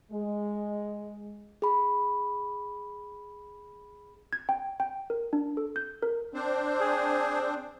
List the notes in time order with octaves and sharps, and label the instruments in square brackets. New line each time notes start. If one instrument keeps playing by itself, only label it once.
[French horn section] G#3
[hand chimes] G#4 B5
[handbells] G#6
G5
G5
A#4
D4
A4
G6
A#4
[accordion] C4 D4 C5
[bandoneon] G#4